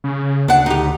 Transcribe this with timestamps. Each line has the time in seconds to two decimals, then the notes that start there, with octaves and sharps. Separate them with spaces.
0.04 C#3
0.48 D2 D4 F#5
0.66 D#4 G4